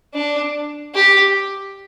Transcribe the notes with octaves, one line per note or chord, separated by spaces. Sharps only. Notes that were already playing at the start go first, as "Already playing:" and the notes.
D4
G4